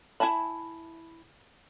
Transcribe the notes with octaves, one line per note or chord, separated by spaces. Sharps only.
E4 G#5 A5 B5